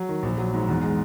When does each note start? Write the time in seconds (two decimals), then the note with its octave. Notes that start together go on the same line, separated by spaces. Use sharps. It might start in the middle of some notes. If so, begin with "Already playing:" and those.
Already playing: F#3
0.09 D#3
0.23 A#1
0.38 F#3
0.54 G#2
0.69 E2
0.83 G#3